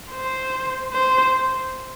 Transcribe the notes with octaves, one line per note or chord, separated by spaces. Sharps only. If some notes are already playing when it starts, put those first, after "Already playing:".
C5
C5